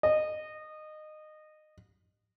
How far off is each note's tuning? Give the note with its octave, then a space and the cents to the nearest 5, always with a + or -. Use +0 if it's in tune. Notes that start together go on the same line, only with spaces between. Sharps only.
D#5 -20